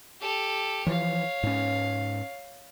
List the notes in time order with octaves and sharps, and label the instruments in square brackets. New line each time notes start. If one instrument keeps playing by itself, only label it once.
[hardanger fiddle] G4 A4
[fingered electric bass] E3 F3 [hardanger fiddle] C#5 F5
[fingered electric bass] G#2 C#4